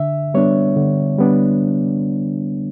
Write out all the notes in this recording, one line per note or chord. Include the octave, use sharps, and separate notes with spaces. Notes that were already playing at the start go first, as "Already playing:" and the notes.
Already playing: D3 E5
G3 B3 D4 C#5
D3
G3 B3 D4